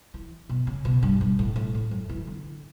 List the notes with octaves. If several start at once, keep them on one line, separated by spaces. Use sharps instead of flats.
E3
B2
C#3
B2
G2
G2
A2
A2
A2
F#2
E3
D3